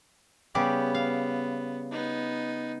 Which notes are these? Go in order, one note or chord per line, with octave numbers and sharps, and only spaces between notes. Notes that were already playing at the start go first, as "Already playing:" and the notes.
C#3 G3 B3 G4
F5
B3 D#4